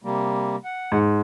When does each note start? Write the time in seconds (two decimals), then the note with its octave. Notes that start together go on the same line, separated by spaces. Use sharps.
0.04 C3 G3 A#3
0.64 F#5
0.92 G#2